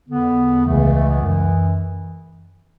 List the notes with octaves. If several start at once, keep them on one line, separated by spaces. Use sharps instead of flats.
E2 D3 B3
C#2 C#3 E3 A3
A3
B3
F#2 E3